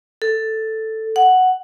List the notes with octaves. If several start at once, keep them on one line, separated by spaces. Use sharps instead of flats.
A4
F#5